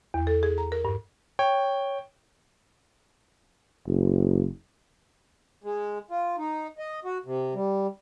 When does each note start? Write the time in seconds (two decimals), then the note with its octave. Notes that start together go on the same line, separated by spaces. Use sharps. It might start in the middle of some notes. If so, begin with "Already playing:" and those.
0.14 E2
0.27 A4
0.43 G#4
0.58 A#5
0.72 A#4
0.85 G2
1.39 C#5 G5
3.87 F#1
5.64 G#3
6.10 F4
6.38 D#4
6.78 D#5
7.04 F#4
7.26 C3
7.54 G3